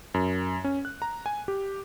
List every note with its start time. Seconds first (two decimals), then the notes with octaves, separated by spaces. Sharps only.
0.14 F#2
0.64 C#4
0.85 F#6
1.02 A#5
1.26 G#5
1.48 G4